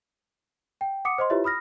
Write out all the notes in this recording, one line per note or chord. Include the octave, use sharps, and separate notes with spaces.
G5
F#5 D6 D#6 C#7
C5 D#5 C6
E4 F4 G4 B4 C#5 E5
B5 D#6 F6 A#6